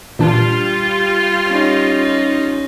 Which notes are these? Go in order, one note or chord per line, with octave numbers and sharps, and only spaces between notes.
A#2 E3 G3 D4 F4
C#4 D#4